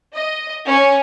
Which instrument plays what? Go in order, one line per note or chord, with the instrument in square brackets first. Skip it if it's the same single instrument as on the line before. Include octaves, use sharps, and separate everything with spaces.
[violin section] D#5
C#4